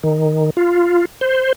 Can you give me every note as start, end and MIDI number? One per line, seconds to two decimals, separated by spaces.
0.03 0.50 51
0.57 1.05 65
1.21 1.53 72